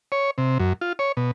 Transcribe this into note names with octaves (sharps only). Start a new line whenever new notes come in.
C#5
C3
F#2
F4
C#5
B2